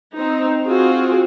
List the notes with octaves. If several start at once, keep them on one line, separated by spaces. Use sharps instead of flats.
C4 D#4
C4 F4 F#4 G#4